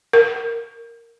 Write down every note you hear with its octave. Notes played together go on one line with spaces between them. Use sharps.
A#4